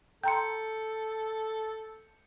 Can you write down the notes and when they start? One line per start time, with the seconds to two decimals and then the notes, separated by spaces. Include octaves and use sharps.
0.23 A4 G5 A#5 C6 G6 C#7